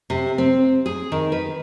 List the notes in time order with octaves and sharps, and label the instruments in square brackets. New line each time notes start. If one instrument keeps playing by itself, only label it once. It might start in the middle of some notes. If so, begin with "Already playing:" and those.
[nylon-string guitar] C3
C4
G#4
D#3
B4